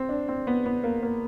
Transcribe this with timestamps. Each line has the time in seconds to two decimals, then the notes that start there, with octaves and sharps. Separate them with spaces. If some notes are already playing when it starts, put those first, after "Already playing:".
Already playing: C4
0.09 D4
0.29 C4
0.47 B3
0.66 B3
0.84 A#3
1.03 A#3